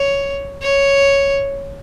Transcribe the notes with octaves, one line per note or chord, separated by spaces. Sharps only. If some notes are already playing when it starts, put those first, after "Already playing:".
Already playing: C#5
C#5